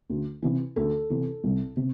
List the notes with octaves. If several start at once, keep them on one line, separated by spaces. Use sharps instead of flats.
D2
C3 E3
D2 A4
C3 E3
C2
C3